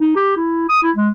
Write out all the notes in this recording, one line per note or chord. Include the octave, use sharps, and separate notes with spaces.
D#4
G4
E4
D#6
E4
G#3